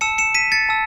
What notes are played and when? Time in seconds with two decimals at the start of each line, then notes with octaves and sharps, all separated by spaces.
0.01 A5 E6 C#7 E7
0.18 C#7 E7
0.35 B6 D#7
0.52 A6 C#7
0.69 A5 E6